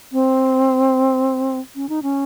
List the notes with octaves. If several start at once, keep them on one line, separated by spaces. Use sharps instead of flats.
C4
C#4
D#4
C#4